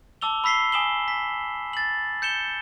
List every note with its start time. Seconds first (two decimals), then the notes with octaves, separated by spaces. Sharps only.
0.21 A5 D6 E6 F7 G7
0.44 B5 E6 B6 C7 G7
0.72 G#5 D#6 E7 F#7 G7
1.08 B6
1.73 A6 F#7
2.22 G6 C#7 E7 G7